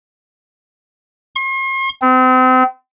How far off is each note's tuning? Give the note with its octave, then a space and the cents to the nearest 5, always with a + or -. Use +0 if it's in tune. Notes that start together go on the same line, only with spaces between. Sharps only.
C6 +45
C4 -35